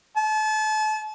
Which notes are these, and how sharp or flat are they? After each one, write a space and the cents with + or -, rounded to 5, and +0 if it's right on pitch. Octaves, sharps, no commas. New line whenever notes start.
A5 -35